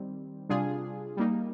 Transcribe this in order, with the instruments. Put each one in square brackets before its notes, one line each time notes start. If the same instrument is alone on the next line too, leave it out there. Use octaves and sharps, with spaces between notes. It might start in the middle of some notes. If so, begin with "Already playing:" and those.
Already playing: [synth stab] D#3 G3 C4
C3 G3 D4 F4 G#4
G3 A#3 D#4